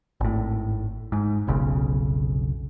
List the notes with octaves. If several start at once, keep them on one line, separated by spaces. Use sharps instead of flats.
G#1 A2
G#2
F1 B1 C#3